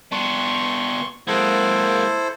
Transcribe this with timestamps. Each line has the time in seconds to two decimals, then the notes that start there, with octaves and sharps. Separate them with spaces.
0.12 B3 D4 C6 C#6
1.27 G#3 A#3 E4 A4 C5 F#5